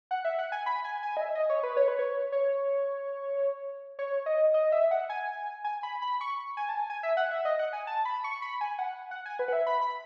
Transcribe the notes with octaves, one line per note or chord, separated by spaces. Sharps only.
F#5
E5
F#5
G#5
B5
G#5
G#5
D#5
E5
D#5
C#5
B4
C#5
B4
C#5
C#5
C#5
D#5
D#5
E5
F#5
G#5
G#5
B5
B5
C#6
G#5
A5
G#5
G#5
E5
F#5
E5
D#5
F#5
G#5
A5
B5
C#6
B5
G#5
F#5
F#5
G#5
B4
F#5
E5
B5
B5